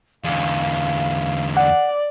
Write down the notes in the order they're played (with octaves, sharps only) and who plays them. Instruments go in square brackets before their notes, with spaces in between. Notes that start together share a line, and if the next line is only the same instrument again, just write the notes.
[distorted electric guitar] E2 D3 [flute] F5
[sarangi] D5 [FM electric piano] F#5